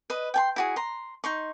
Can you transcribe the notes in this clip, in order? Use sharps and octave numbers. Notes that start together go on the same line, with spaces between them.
B4 D#5
G5 G#5 C6
E4 F#4 G#4
A#5 C6
D#4 C6 C#6